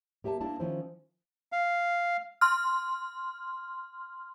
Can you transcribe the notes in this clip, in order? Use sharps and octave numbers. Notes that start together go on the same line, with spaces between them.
A#3 G4 E5 G#5 A5
A#3 D4 E4 A5
D#3 F3 C#4 E4 C5
F5
C6 F6